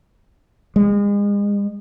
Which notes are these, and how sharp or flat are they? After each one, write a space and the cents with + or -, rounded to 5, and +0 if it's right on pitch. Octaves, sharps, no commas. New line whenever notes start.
G#3 -35